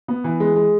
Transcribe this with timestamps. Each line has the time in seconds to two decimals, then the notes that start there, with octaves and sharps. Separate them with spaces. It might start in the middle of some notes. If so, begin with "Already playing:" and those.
0.08 B3
0.24 E3
0.40 G#3
0.56 G#3